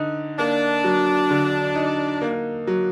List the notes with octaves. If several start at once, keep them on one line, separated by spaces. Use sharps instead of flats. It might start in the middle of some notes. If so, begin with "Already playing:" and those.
Already playing: D3 D#4
A#3 D4
F#3
D3
D#4
A#3
F#3